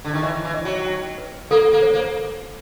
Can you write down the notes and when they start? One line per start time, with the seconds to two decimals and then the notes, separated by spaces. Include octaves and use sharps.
0.05 D3
0.13 D#3
0.22 E3 D#5
0.44 E3
0.54 D#5
0.65 F#3
0.87 G5
1.18 B4
1.51 A#3 A4
1.73 A#3
1.82 C5
1.93 A#3